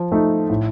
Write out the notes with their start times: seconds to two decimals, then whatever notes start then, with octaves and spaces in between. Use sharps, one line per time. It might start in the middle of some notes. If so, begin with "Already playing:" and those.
Already playing: F3
0.12 A3 D#4
0.50 A2